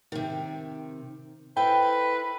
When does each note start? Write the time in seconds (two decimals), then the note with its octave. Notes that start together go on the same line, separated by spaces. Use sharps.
0.12 C3 D#3
1.57 E4 A4 B4 C5 G5